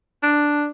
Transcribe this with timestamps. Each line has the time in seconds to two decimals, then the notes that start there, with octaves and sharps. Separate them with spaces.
0.23 D4